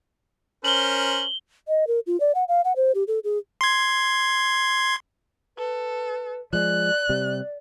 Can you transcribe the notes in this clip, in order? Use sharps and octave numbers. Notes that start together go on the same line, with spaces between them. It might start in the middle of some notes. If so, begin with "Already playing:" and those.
C#4 A#4 C5 F#7 G7
D#5
A#4
F4
D5
F#5
F5
F#5
C5
G4
A4
G#4
C6 G#6
A4 B4
F3 G#3 D5 F#6
C3 G3